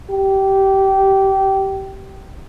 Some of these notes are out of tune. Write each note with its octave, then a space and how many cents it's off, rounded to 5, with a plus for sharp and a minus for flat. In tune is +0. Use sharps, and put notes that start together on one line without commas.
G4 -20